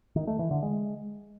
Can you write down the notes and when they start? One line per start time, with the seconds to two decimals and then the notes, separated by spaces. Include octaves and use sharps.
0.16 D#3
0.27 A3
0.39 E3
0.51 D3
0.63 G#3